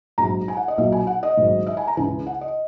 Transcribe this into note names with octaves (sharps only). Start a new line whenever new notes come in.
A#1 G#2 F#3 A#5
G#5
F#5
D#5
B1 A#2 F#3 E5
G#5
F#5
D#5
A#1 G#2 D#3 F#3
E5
G#5
A#5
C#2 C#3 E3 G#5
F#5
D#5